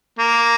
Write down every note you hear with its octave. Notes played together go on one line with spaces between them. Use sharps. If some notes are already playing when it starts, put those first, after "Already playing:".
A#3